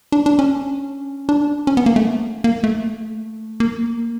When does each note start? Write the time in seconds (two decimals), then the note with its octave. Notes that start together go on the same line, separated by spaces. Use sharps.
0.12 D4
0.26 D4
0.39 C#4
1.29 D4
1.67 C#4
1.77 B3
1.86 A#3
1.96 A3
2.44 A#3
2.64 A3
3.60 A#3